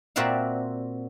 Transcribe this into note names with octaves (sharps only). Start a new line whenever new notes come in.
A#2 C4 F#4 D5 E5 F5